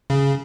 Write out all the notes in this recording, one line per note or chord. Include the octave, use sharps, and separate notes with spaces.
C#3